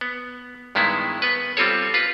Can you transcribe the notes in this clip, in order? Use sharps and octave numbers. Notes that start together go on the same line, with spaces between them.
B3
G2 D#3 G#3 B3 E4
B3 B4
G3 C4 F4 A4 C#5
F4 B4